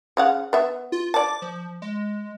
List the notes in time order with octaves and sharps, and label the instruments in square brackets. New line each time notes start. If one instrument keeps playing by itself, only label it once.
[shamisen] C#3 F5 F#5
B3 E5
[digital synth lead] F4
[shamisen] D5 A5 [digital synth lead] D6
[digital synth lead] F3
G#3